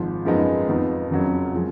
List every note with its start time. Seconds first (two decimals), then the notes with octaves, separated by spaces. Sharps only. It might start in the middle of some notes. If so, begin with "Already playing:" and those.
Already playing: G#1 G#2 F3
0.25 F#2 F3 G#3 B3 D#4
0.68 F2 F3 B3 D#4
1.10 F#1 F2 C#3 F#3
1.54 F3 G#3